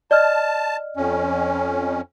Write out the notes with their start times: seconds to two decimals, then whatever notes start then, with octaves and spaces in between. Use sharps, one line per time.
0.11 D5 D#5 A5 F6
0.97 F2 C#4